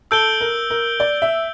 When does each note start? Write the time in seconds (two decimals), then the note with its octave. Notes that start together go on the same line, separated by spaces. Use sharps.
0.11 A4 E6 G6 D7 G7
0.41 A#4
0.70 A#4
1.00 D5
1.22 E5